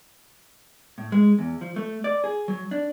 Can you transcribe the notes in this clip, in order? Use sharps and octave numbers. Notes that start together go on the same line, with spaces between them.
A2
G#3
E2
F3
A3
D5
G#4
F#3
D4